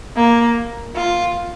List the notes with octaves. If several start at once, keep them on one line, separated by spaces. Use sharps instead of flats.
A#3
F4